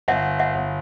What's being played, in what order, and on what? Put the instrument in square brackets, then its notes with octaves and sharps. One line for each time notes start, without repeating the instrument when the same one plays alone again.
[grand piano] G1 [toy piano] E5 F#5
[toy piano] E5 F#5
[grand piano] G1